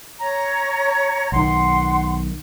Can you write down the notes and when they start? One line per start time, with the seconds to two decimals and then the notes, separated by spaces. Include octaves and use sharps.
0.20 C#5 A#5
1.32 B1 D#3 F#5 C6